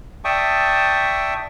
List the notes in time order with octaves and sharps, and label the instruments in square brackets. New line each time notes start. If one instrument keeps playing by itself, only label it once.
[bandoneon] D5 E5 G5 A5 C#6 D#6